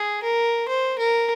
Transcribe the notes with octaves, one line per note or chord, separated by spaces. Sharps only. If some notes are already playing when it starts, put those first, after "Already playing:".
Already playing: G#4
A#4
C5
A#4